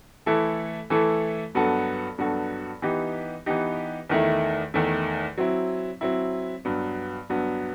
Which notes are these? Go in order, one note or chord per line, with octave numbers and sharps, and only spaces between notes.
E3 A3 E4 A4
E3 A3 E4 A4
G2 F#3 B3 F#4 A4
G2 F#3 B3 F#4 A4
E3 B3 D#4 G4
E3 B3 D#4 G4
E2 D#3 A3 E4
E2 D#3 A3 E4
F#3 C4 E4
F#3 C4 E4
G2 F#3 B3
G2 F#3 B3